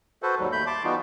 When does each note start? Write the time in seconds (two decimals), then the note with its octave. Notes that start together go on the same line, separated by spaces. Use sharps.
0.23 F#4 A4 B4 C5
0.39 D#2 G#2 F#3 G3
0.52 D#2 A3 B5 G6
0.67 A5 C6 D6
0.84 E3 G3 B3 D#4 F4 F#4